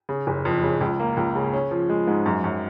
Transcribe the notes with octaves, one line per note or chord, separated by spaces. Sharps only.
C#3
F#1
F2
C#3
C#2
A#3
C#2
C#3
C#4
F3
G#3
G#2
F#2
F#2